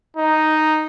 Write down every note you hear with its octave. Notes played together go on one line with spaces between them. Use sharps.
D#4